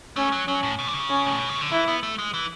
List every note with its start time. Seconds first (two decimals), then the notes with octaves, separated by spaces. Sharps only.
0.16 A3 C#4
0.32 F#3
0.47 F#3 C#4
0.63 A2
0.79 B2
0.88 D3
0.94 C#3
1.10 C#4
1.27 A2
1.37 B2
1.49 C#3
1.61 D3
1.72 E3 E4
1.88 B3
2.03 A3
2.19 G#3
2.34 E3